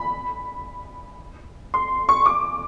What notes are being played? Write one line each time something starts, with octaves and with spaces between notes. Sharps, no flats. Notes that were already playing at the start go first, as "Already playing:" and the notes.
Already playing: B5
C6
C#6
D6